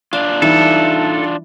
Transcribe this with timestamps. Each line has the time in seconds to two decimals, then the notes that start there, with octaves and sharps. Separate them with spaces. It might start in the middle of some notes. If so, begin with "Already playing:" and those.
0.13 D4 F4 F5
0.42 E3 G3 D#4 A4